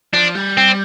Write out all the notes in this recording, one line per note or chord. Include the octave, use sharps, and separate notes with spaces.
F3 D4
G3
C4